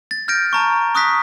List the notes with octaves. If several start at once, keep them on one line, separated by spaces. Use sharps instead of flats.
A6
F6 G6 A6 A#6 D7
A5 A#5 C#6
C#6 D#6 F#6 A#6 B6
B6